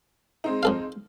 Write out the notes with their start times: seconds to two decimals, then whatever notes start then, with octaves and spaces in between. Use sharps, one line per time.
0.44 G#3 C4 D#4
0.63 F2 A4 F5